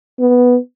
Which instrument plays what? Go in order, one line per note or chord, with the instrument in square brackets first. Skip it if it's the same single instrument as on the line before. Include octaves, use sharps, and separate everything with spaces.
[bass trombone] B3